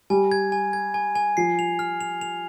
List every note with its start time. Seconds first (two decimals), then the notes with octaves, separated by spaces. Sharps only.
0.10 G3 G#5
0.32 G#6
0.52 G#5
0.73 G#6
0.94 G#5
1.15 G#5
1.37 F3 C7
1.59 F7
1.79 F6
2.01 F7
2.21 F7